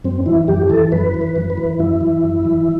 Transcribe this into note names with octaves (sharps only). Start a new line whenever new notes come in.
F#2 C4
E3 E4
F#2 G4
E3 A4
F#2 B4
E3
B4
F#2
B4
E3
F#2 E4
E3
F#2
E3